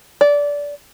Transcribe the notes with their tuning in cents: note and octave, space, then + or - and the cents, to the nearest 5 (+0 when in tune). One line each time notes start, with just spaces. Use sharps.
D5 -20